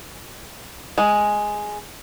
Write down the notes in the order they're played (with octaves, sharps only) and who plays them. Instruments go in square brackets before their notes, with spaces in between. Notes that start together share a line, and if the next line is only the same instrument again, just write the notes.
[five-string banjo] G#3